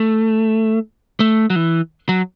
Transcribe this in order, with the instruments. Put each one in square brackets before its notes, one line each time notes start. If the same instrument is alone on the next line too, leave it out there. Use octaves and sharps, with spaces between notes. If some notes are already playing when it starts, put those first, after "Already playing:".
Already playing: [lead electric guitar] A3
A3
F#3
E3
F#3